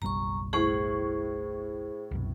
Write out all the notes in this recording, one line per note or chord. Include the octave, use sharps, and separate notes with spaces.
F#1 B1 G3 A#5 C#6
A2 G#4 C5 C#6 F#7
C2 F#2 B2